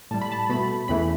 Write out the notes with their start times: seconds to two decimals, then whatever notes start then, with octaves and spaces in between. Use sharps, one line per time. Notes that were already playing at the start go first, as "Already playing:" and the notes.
0.11 A2 G3 A5
0.21 B5
0.32 A5
0.49 B2 A3 B5
0.88 E2 C#3 E3 A3 B5